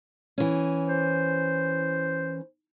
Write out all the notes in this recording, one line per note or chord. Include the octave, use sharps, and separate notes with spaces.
E3 C#4
C5